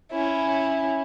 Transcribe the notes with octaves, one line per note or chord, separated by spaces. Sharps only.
C#4 E4